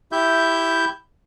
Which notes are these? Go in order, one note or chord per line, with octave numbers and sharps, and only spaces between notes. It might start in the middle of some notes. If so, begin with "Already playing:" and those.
E4 G4 E5 G6